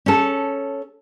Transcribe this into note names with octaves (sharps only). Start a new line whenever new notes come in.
C#4 A4